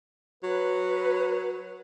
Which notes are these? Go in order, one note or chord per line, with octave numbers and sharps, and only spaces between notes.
F#3 B4